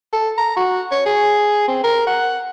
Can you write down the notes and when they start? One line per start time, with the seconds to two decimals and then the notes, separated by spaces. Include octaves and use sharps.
0.13 A4
0.38 A#5
0.56 F#4
0.92 C#5
1.06 G#4
1.68 C4
1.84 A#4
2.07 F#5